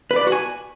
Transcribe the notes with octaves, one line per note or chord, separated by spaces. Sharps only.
B4
D5
B4
F#4
G#5